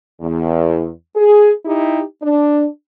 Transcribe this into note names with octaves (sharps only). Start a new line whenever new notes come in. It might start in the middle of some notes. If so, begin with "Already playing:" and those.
E2
G#4
D#4 E4 G4
D4